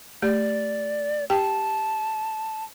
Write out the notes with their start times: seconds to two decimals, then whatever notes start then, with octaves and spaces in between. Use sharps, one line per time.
0.22 A3 G4 D5
1.30 G4 G5 A5